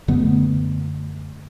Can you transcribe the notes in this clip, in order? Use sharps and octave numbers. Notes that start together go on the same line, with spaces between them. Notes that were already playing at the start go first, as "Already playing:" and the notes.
F#2 D3 A3 B3